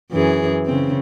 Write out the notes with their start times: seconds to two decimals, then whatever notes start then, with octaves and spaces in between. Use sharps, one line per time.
0.11 F#2 E3 G#4
0.66 C#3 C4